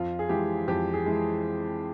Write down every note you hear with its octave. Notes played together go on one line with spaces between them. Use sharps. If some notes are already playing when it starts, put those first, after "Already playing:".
Already playing: F2 F4
G#4
E3 G#3 G4
F2 G4
G#4
E3 G#3